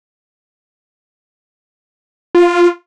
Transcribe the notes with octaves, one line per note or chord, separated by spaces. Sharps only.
F4